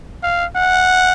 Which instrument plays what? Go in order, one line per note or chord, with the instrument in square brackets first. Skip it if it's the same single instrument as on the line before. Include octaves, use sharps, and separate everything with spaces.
[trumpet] F5
F#5